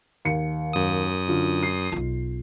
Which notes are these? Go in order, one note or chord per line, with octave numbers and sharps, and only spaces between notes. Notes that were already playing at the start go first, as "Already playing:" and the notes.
D#2 C#7
F#2 D#6
D3 F4
C7
B1 F4